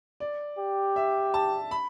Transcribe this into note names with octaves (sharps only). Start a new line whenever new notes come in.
D5
G4
E5
A5
B5